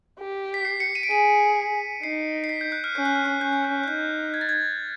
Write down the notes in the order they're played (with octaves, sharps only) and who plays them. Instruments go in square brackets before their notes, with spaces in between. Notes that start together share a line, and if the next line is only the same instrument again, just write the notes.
[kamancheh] G4
[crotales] B6
C7
C#7
D#7
D7
[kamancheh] G#4 [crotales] D#7
[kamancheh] D#4 [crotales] C7
[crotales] C7
B6
G6
F#6
F6
[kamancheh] C#4 [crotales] G6
[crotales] F#6
F6
F#6
[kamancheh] C#4 [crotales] G6
[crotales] F#6
G6
F#6
[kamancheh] D#4 [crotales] G6
[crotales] G#6
A6
G#6